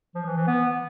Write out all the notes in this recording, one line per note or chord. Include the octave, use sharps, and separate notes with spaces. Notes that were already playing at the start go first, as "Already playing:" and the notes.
F3
E3
E3
B3